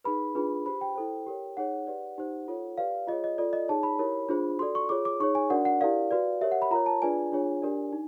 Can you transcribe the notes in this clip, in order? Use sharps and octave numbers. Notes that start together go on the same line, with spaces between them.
D#4 G#4 B4 B5
D4 F4 G#4 B4
G4 C5 B5
G5
E4 A4 C5
G4 A#4 C#5
D#4 G#4 C#5 F#5
G4 B4 D5
D#4 G4 C5
F4 A4 C#5
G4 B4 D5 F5
F4 G#4 C#5 D#5
D#5
F4 A4 D5
D#5
D#4 G#4 C#5 A5
B5
E4 G4 A#4 C#5
D4 F4 G#4 C5
F#4 A4 D5 C6
C#6
F4 G#4 C#5 D6
D6
D#4 G#4 C#5 C#6
G#5
D4 F#4 A#4 D5 F#5
F#5
E4 G4 A#4 D5 F5
F#4 B4 D5
G4 A#4 C#5 E5
F#5
B5
F4 A#4 C#5 A#5
A5
D4 F4 G#4 B4 D5 G#5
D4 F4 G#4 C#5
D4 G4 A#4 D5
D#4